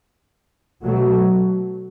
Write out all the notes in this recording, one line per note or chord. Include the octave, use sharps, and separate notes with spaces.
B2 F#3 A3